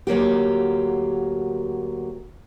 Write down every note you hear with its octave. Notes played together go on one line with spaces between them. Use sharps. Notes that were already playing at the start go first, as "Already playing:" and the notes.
D2 F#3 A#3 G4